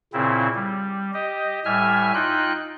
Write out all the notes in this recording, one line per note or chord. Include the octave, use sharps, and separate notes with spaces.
A#2 C#3 C4 E4
G3
G4 D#5
A2 G3 E5 G#5 F6
D#4 F4 G5 F#6